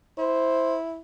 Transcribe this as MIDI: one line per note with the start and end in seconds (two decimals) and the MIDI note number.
0.18 0.99 64
0.18 0.76 72